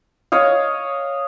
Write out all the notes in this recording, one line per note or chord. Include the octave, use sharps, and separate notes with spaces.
C#5 D#5 F5